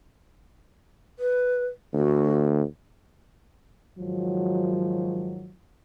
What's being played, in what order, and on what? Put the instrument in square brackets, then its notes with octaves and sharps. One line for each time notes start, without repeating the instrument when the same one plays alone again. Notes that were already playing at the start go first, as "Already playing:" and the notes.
[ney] B4
[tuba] D2 [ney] F#4
[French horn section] G#2 D#3 F3 F#3